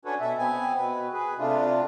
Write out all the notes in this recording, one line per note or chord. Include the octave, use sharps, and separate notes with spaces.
C#4 D4 F#4 A4 B4 C#5
B2 A4 E5
B3 C4 G#5
B2 B4
G#4 B4
C3 A3 D4 F4